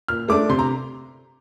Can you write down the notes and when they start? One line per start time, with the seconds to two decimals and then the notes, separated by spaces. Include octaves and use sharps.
0.08 A#2 F6
0.28 A3 D4 D6
0.49 C3 C6
0.59 A#5